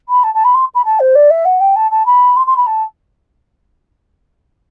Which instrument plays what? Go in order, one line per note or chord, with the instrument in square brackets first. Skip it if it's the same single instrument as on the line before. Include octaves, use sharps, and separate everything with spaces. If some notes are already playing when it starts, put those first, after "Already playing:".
[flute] B5
A5
A5
B5
C6
B5
A5
C5
D5
E5
F#5
G5
A5
A5
B5
C6
C6
B5
A5